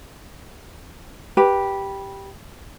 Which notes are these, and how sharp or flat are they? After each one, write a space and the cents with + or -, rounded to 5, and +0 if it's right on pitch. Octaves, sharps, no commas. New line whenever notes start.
G4 +0 B4 -15